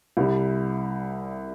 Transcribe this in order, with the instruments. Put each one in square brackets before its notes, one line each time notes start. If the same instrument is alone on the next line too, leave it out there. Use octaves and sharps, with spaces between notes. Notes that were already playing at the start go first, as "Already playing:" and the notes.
[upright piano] C2 C3 G3